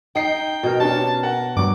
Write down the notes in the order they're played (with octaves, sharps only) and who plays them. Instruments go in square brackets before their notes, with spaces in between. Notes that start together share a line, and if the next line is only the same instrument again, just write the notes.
[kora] D#4 [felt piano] D#5 C7 [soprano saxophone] G5
[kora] B2 A#4 [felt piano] D#5
[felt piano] C#4 D4 G4 [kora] C#5 [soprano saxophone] A5
[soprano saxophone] A#4 [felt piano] F#5
[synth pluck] G2 F#3 [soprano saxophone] D6